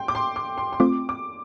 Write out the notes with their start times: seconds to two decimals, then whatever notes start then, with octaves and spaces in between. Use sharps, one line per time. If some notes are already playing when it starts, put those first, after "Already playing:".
Already playing: G5 C6
0.08 D6
0.15 C6
0.36 D6
0.58 C6
0.73 C6
0.80 A3 C4 F4 D6
1.09 D6